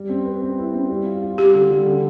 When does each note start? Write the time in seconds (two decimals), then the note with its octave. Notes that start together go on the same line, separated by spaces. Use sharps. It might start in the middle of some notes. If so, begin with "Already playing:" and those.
Already playing: G3
0.09 C4
0.25 B4
0.42 C4
0.58 E4
0.74 C4
0.90 G3
1.06 F4
1.22 F4
1.38 G3 G4
1.54 D3
1.70 G3
1.86 D3